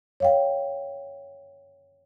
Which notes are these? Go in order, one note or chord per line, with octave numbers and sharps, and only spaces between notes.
C#5 F5 G5